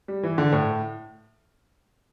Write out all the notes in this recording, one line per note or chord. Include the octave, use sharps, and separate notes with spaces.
G3
E3
D3
A2